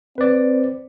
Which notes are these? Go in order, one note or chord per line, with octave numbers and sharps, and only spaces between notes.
C4 B4 D5